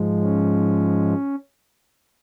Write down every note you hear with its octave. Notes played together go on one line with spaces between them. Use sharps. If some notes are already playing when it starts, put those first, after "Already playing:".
Already playing: G#2 F3 G#3
C#4